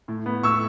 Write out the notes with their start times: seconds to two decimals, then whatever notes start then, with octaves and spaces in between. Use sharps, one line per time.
0.08 A2
0.26 B3
0.43 A2 C#6 E6